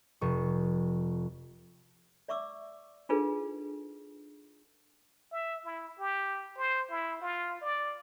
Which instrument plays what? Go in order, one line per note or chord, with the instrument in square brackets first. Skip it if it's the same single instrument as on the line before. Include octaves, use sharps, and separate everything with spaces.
[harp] F1 C#6
[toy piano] D5 E5 C#6 D6 E6
D4 D#4 F4 G#4 A4 B4
[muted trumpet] E5
E4
G4
C5
E4
F4
D5